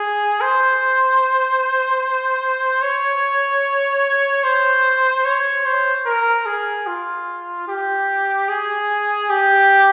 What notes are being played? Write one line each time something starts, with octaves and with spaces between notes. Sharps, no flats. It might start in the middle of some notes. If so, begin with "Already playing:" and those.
Already playing: G#4
C5
C#5
C5
C#5
C5
A#4
G#4
F4
G4
G#4
G4